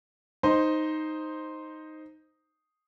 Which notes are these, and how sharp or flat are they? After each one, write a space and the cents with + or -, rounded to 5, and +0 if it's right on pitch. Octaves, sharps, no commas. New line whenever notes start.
D#4 +0 C5 +0